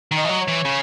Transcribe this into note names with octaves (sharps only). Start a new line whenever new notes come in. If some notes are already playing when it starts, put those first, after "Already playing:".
D#3
D#5
E3
F#3
C#5
E3
C#3